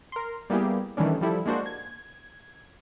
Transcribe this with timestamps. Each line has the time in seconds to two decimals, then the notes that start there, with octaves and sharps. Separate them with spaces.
0.12 A#4 C6
0.50 G3 A#3 B3 E4 G4 G#4
0.97 D#3 E3 G3 A3 C#4 D4
1.21 F3 G3 E4 A4
1.46 G#3 A#3 D4 F#4 C5
1.66 G#6